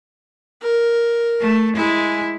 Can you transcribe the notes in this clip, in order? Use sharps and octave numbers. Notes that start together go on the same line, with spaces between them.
A#4
A3
G#3 E4 G#5